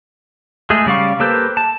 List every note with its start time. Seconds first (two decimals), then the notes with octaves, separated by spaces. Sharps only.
0.70 G#3 A3 G#4
0.86 C#3 G3 D5 F5 C#6
1.20 A#3 G4 A4 B4 C5
1.57 A5